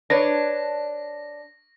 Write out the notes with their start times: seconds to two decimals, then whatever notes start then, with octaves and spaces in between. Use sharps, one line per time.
0.10 D4 B4 C#5 A#6